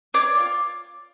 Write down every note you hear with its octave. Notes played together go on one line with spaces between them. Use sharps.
C#5 D5 D6
F4